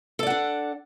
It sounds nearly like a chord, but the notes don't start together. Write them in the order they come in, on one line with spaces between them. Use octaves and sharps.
A4 D5 F#5 D4